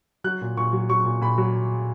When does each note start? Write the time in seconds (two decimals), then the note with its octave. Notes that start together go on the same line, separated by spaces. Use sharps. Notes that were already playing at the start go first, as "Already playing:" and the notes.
0.24 F#3 F#6
0.41 A#2
0.57 A#2 C#6
0.73 F#3
0.89 F#3 C#6
1.05 A#2
1.21 A#2 B5
1.38 F#3